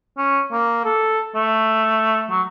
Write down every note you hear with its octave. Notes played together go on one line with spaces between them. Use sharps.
C#4
A#3
A4
A3
F#3